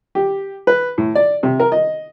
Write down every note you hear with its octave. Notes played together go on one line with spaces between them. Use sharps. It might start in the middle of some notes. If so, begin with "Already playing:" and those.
G4
B4
A2
D5
C3
A#4
D#5